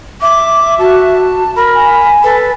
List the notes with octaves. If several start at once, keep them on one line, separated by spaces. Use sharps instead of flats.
E5 D6
F#4 A5
A#4 B5
G#5
A4 B4